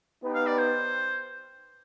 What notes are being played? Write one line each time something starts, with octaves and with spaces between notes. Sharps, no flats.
B3 D#4 G4 B4
F5
D5
C5